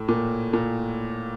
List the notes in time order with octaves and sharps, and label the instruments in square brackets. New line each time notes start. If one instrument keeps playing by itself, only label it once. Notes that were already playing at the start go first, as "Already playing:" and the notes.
Already playing: [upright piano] A2
A#2
A#2